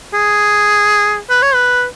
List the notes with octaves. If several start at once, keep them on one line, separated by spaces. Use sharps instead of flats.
G#4
B4
C#5
B4